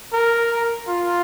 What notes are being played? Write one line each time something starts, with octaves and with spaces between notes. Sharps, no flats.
A#4
F4